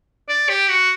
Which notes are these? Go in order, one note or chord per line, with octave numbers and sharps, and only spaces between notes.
D5
G4
F#4